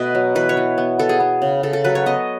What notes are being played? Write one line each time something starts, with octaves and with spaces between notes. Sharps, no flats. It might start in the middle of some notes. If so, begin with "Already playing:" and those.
Already playing: B2 A3 B4 D#5
F#3
E3 B4
C#5
E3
B3
B3 A4
G#4
B3
C#3
C#3 A4
A4
F#3 B4
C#5
B3 D#5